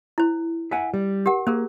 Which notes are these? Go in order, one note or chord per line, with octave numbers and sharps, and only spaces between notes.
E4 C5
E5 F#5 G#5
G3
G4 A#4 F#5
A#3 G#4 A#4 C5